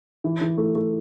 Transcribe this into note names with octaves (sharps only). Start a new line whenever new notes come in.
E3
E3
A3
A3